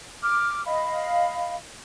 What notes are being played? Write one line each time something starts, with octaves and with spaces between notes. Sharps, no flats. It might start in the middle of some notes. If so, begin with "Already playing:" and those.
D6 F6
D#5 F5 B5